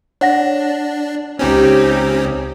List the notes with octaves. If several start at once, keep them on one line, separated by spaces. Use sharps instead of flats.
D4 C#5 F#5 A#6
C#2 C4 C#4 D#4 G4